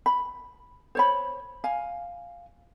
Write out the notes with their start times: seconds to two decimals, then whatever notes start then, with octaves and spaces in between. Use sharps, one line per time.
0.06 B5
0.95 C5 C#5 B5
1.64 F5 G#5